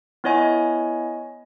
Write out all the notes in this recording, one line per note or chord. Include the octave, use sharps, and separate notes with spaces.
B3 E4 C#5 D#5 G#5